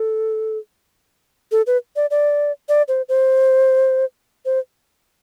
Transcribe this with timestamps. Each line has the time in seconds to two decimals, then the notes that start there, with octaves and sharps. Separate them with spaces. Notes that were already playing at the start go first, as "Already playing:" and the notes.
Already playing: A4
1.52 A4
1.67 B4
1.96 D5
2.11 D5
2.69 D5
2.88 C5
3.09 C5
4.45 C5